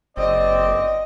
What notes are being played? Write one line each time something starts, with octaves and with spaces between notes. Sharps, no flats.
F#1 C4 D5 D#5